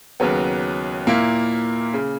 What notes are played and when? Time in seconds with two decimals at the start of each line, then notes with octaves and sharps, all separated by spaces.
0.20 D#2 C#3 F#3 B3
1.07 A#2 A#3 E4
1.94 C#3